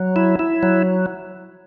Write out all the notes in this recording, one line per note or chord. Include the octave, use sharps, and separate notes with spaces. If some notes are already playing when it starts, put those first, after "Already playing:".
Already playing: F#3
E4
E4
F#3